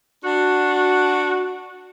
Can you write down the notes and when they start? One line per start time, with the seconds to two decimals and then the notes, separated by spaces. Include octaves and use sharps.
0.23 D4 F#4